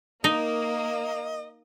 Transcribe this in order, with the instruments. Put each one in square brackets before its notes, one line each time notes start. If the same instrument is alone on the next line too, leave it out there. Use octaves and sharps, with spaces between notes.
[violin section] A#3 [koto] D#4 [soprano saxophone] D#5